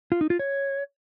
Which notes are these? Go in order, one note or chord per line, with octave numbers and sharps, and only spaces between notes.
F4
D#4
F4
C#5